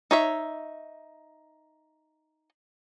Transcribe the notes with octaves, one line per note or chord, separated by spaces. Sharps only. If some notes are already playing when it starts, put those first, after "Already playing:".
D#4 C#5 E5